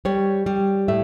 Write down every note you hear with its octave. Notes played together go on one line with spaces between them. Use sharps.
G3 C#5
G3
A2 E5